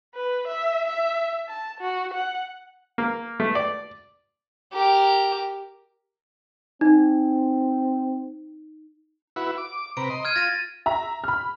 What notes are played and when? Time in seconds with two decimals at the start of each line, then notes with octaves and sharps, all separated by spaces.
0.15 B4
0.48 E5
0.87 E5
1.48 A5
1.81 F#4
2.14 F#5
2.98 A#3
3.40 A3
3.55 D5
4.73 G4 A#4
6.81 C4 D#4
9.36 E4 F#4 B4
9.58 D6
9.97 C3 B4 A#5 D7
10.10 D#5 C6
10.25 C6 F6 G#6 D#7
10.36 F4 A6 A#6 D#7
10.86 E5 A#5
11.24 B5 F6